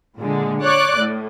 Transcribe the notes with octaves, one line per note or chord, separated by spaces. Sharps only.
A#2 D3 G#3
C#5 D5 D6 F#6
A2